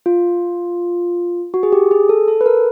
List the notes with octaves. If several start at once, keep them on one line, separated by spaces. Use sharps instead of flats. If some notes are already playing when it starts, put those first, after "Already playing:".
F4
F#4
G#4
G4
G#4
A4
A4
B4
A#4